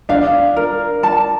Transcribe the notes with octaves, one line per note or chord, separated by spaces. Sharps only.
D4 F5
A#4
A5